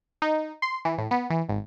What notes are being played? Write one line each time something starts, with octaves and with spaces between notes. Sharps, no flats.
D#4
C6
E3
A2
B3
E3
G#1